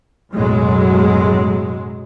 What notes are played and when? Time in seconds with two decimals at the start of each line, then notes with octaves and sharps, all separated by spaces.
0.31 B1 F#2 A2 F#3 G#3